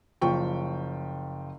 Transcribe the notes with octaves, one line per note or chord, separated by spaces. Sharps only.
F#1 F3 G5 C#6